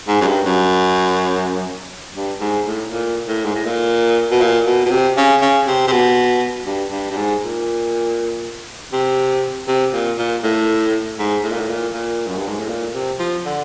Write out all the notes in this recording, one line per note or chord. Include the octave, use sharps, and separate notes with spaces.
G#2
F#2
G2
F#2
G2
G#2
A2
A#2
A2
G#2
A2
A#2
B2
A#2
B2
B2
C3
C#3
C#3
C3
C3
B2
G2
G2
G2
G#2
A#2
C3
C3
A#2
A#2
A2
G#2
A2
A#2
A2
A#2
A#2
F#2
G2
G#2
A2
A#2
C3
F3
D3